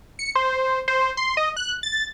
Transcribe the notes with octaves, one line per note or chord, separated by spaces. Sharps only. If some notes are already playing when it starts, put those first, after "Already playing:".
C#7
C5
C5
C6
D#5
F#6
A6